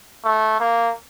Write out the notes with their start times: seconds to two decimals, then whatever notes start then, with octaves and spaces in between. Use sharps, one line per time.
0.24 A3
0.60 A#3